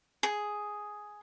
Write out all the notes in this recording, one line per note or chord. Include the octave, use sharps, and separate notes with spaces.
G#4